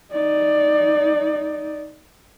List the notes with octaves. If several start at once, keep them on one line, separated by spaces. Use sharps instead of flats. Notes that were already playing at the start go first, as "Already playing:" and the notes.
D#4 D5